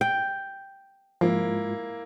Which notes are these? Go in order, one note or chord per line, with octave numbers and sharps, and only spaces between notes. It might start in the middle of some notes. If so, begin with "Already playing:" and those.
G5
G#2 F3 G#3 A#3 E4 F4